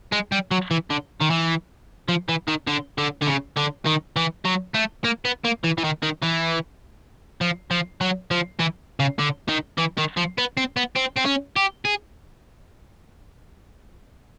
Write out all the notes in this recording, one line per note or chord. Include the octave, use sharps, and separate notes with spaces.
G#3
G3
F#3
E3
D3
D#3
E3
F3
E3
D#3
D3
D3
D3
C#3
D3
D#3
E3
F#3
A3
A#3
B3
A#3
E3
E3
D#3
D#3
E3
F3
F3
F#3
F3
E3
C#3
D3
D#3
E3
D#3
F3
B3
C4
B3
C4
C4
C#4
G4
G#4